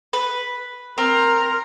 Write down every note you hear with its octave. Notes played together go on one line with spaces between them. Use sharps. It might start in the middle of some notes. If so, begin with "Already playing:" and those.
B4
C4 A#4 A#5 F6